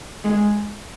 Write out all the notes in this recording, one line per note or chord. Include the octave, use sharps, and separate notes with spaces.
G#3